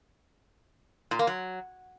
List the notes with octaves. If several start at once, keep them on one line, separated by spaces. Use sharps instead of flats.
A#2
A#3
F#3